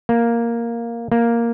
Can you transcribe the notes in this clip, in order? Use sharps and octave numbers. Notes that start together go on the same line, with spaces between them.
A#3
A#3